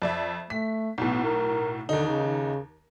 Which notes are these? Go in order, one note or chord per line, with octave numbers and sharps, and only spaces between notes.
F2 D5 E5
A3 B6
B1 A2 B3
A#4
D#2 D3 D#4
C#3